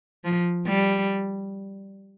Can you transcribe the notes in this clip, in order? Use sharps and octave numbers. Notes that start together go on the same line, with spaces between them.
F3
G3